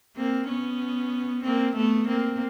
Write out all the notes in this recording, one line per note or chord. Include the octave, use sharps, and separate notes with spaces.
A#3 C4
B3 C#4
A#3 C4
A3 B3
A#3 C4